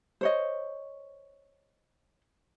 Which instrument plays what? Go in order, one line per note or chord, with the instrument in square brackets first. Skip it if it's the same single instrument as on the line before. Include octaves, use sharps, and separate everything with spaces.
[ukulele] C5 C#5 D#5